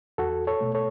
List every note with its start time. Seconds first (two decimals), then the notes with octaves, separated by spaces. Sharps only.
0.18 E2 F#4 A4
0.47 A4 C#5
0.61 B2 A3
0.75 A4 C#5